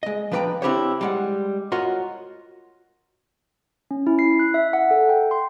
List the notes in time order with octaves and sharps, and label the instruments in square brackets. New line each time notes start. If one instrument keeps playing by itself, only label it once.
[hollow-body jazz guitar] G#3 D#5
F3 D4 B4 C#5 G5 A#5
C4 D4 E4 G4 C5 C#5
G3 G#3 F#5
F4 F#4 A#4 C#5 D#5
[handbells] C#4
E4
C7
F#6
E5
F#5
A4
G5
C6